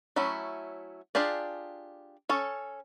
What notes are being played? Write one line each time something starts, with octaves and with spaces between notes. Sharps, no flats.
F#3 A3 C#4 E4
D4 F4 G4 G#4 D5
C#4 A4 C#5